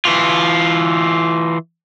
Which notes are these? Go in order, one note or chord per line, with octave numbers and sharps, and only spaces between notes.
E3 F4